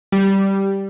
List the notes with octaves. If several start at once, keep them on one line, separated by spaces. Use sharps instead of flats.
G3